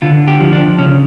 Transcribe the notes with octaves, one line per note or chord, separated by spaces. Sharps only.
D3 F4
G4
F3
D4
C#3 C#4